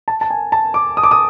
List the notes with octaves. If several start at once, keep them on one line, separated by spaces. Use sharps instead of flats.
A5
A5
G#5
A5
D6
D#6
D6
D#6